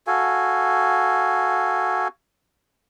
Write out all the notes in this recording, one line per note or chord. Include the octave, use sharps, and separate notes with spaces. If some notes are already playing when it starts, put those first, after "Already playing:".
F#4 A4 F5 G#5